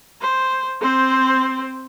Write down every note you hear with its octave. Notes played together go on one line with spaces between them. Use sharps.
C5
C4 C5